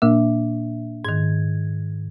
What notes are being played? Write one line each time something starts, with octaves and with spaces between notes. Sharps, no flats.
A#2 A#3 D4 E5
G#2 D#3 G#6